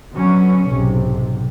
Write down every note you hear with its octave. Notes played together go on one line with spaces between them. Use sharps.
D3 F#3 B3 C#4
B1 G#2 C3